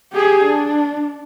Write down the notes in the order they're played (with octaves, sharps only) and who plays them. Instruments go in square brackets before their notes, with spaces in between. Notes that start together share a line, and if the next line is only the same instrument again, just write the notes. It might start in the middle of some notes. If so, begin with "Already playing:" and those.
[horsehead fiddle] G4 G#4
D4